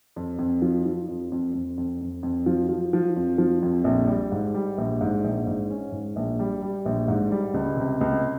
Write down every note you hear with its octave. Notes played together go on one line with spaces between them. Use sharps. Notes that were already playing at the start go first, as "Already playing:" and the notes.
F2
F2
F3
F3
F2
F2
F2
F2
F2
F2
F3
F3
F3
F2
F3
F2
A#1
G3
G#2
G3
A#1
G#2
A#1
G#2
C#4
G#2
A#1
G3
G3
A#1
G#2
G3
C#2
C3
C#2